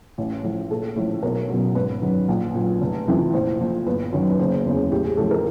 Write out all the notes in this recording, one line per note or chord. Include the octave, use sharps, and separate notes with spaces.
A1
A2 F3
A#1 A4
A2 F3
B1 A#4
F#3
B2
G#1 B4
F#2 D#3 F#3
A#1
A#2 F#3
F1
F2 C3 E3
A#1 C5
A#2 F3
G1 B4
F#2 D#3 F#3
B4
F#1 C5
E2 C#3
A1 G4
G#4
A2 F3 A4
A#4